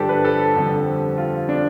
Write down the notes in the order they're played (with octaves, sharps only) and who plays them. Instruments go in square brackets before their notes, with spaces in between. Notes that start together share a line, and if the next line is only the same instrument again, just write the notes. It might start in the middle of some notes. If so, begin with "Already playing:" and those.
Already playing: [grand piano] G2 D3 F3 D4 G4 A4
B4
A4
F2 D3 G3
F4
D4